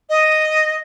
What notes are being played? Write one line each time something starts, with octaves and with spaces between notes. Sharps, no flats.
D#5